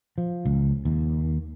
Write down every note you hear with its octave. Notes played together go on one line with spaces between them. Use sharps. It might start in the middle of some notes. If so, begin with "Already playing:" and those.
F3
C#2
D#2